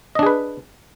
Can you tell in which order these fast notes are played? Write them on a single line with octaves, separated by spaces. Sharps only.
D#5 D4 G#4 B4